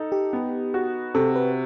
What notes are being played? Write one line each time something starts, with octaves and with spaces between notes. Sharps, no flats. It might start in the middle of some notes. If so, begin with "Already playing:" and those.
Already playing: D#4 A4
G4
B3
F#4
C3 A4
B4